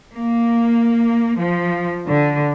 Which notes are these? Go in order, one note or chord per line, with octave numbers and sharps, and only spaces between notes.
A#3
F3
D3